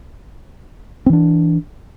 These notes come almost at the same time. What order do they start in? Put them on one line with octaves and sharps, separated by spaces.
C4 E3 D4